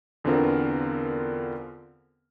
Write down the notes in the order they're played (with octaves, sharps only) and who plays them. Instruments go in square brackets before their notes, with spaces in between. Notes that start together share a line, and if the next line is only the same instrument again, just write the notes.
[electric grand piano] E2 D3 B3 C4 F4 A#4